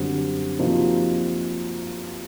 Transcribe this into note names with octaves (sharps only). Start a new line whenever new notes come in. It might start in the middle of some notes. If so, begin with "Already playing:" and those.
Already playing: F#2 D3 G3 C4
C3 F3 A#3 D#4 F#4